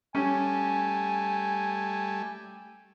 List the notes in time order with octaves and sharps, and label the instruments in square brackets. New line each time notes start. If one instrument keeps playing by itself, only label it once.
[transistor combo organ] G3 A3 [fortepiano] C#4 [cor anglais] G#5